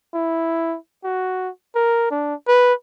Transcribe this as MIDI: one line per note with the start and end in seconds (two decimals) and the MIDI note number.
0.14 0.77 64
1.04 1.50 66
1.76 2.11 70
2.11 2.35 62
2.48 2.74 71